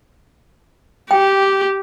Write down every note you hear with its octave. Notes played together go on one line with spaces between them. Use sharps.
G4 G5